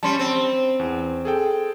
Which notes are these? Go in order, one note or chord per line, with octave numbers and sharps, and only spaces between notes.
G3 C#4 A5 C6
C4
E2
G#4 A4 G5